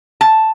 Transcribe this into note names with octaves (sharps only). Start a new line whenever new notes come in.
A5